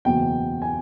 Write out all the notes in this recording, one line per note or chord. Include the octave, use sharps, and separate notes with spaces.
F#1 E2 B2 G5
G#5